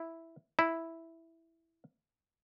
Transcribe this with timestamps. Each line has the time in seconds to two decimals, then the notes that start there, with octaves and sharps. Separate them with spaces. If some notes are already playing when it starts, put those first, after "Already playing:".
Already playing: E4
0.59 E4